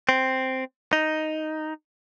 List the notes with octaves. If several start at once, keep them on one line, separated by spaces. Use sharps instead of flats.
C4
D#4